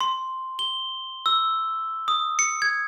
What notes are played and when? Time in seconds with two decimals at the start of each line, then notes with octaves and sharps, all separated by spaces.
0.01 C6
0.59 G7
1.26 E6
2.08 D#6
2.39 C#7
2.62 G#6